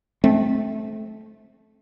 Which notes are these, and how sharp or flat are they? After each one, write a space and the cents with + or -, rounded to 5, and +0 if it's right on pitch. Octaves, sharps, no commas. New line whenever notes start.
A3 -20 C4 +0